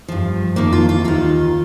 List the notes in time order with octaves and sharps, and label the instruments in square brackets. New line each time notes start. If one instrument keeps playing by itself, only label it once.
[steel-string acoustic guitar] G2 F3
F2 D#3 A#3
F4
F4
D#2 D#3 F4